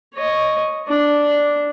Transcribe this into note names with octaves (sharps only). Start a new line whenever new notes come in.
C#5 D#5
D4